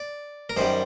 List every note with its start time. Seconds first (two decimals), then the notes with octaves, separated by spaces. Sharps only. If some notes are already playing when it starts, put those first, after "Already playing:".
Already playing: D5
0.50 A#4
0.57 F#2 D#3 G3 C5